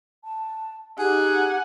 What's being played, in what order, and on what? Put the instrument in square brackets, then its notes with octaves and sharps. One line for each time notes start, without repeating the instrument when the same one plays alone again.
[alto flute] A5
[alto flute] D#4 [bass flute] G4 [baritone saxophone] G#4 [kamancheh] F#5 G#5